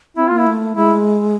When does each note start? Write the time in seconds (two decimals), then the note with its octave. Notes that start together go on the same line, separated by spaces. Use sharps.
0.17 C4 E4
0.28 A#3 F4
0.38 E4
0.47 A3
0.75 G#3 E4